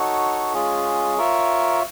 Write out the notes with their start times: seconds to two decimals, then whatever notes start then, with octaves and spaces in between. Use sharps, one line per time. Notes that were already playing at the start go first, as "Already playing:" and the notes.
Already playing: D#4 F#4 A4 C#5
0.54 G#3 C#4 F4 G#4
1.18 F4 A#4 C#5 E5